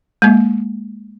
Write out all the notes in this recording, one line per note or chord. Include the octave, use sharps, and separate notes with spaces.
G#3 A#3